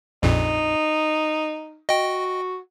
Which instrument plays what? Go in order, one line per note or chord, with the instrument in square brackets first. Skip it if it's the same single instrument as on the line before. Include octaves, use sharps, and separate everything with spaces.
[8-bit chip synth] A#1 F2 A#2 [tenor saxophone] D#4
[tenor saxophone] F#4 [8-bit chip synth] D#5 G5